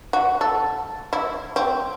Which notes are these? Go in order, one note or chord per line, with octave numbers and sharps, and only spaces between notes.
F#4
A4
E4
C4